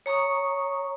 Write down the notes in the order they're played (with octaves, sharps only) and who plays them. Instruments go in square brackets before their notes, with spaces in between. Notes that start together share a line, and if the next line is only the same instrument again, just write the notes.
[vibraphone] C#5 A#5 C#6 D#6